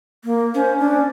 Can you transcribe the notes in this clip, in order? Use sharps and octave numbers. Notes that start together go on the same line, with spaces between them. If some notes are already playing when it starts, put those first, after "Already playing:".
A#3
C#4 C5
D4